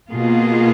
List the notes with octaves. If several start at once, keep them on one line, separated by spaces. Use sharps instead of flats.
B2 A#3 F4 G#4